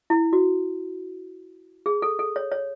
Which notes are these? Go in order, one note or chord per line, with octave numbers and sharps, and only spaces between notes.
E4
F#4
G#4
A4
A4
C#5
C#5